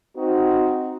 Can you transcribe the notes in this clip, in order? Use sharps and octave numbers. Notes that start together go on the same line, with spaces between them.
C4 D#4 F#4